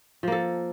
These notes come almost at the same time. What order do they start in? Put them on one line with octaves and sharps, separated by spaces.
F3 A#3 A4